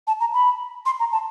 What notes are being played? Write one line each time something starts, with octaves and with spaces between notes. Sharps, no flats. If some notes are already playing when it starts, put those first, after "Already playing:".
A5
A#5
B5
C6
A#5
A5